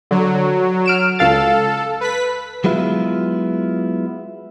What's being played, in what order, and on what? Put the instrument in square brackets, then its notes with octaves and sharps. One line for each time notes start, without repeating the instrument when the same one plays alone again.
[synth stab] D3 [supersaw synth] F#3
[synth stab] F6 D7 E7
[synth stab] C#2 F5 A6 [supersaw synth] A4
[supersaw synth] B4 B6
[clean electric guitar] F#3 G#3 B3 E4 F4